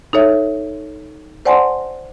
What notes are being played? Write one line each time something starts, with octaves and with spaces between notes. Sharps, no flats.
D#4 A4 C#5 E5
C5 D5 F#5 G#5 A5 C6